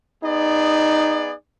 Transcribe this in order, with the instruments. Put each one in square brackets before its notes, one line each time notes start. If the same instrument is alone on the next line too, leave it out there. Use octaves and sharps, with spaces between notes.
[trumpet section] B3 G#4 D5 [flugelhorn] D#4